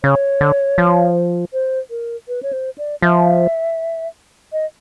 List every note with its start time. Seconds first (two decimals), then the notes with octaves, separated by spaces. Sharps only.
0.03 C#3 C#5
0.41 D3
0.78 F3
1.53 C5
1.90 A#4
2.28 B4
2.43 C#5
2.53 C5
2.78 D5
3.02 F3 E5
4.53 D#5